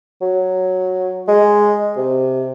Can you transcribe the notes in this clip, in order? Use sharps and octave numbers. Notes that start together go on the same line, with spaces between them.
F#3
G#3
C3